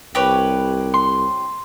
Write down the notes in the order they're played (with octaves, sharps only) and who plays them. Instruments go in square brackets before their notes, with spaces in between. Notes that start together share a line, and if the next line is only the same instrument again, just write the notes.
[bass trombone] C2 [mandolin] G4 B4 C#5
[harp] C6